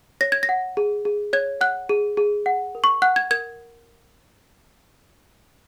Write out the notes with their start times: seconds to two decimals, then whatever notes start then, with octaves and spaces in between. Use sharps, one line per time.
0.21 C#5 A#6
0.32 G#6
0.43 A#6
0.49 F#5
0.77 G#4
1.05 G#4
1.33 C#5 G#6
1.61 F#5 F#6
1.89 G#4
2.17 G#4
2.46 F#5
2.75 A#4
2.84 C#6
3.02 F#5 F#6
3.16 G#6
3.31 A#4 G#6